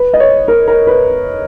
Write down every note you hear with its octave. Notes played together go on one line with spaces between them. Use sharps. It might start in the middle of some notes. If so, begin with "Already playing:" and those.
Already playing: B4
D#5
C#5
A#4
A#4
B4